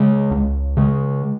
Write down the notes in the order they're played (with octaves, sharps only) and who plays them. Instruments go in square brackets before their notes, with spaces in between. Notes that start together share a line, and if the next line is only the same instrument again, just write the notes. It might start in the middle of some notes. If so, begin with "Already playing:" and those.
Already playing: [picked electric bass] C#3 G#3
C#2
C#3 G#3